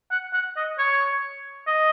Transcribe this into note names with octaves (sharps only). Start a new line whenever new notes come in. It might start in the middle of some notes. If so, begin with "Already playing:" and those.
F#5
F#5
D#5
C#5
D#5